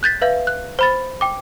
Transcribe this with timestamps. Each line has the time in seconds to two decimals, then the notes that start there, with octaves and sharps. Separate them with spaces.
0.03 F#6 G6 A6 B6
0.22 B4 E5 F5 G6
0.47 F#6
0.79 C5 B5 A6
1.21 G5 D6